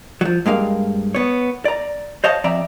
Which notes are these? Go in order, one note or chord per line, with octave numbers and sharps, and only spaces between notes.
F3 F#3
G2 G#3 A#3 F5
B3 C#5
D5 A#5
C5 C#5 D#5 F5 A5
F2 D5 E5 A#5